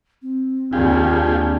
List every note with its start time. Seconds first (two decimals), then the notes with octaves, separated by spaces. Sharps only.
0.22 C4
0.73 D#2 C4 D4 F4 G4 G#4